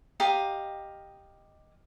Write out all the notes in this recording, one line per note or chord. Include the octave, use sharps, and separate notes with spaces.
G4 D#5 F5 A#5